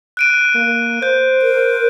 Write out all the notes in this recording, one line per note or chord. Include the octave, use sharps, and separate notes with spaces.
F#6 D7 D#7
A#3
C5 G6
A#4